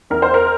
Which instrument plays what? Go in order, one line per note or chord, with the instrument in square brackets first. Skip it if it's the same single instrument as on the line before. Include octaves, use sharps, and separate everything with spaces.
[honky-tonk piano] E2 A#4
C5
A#4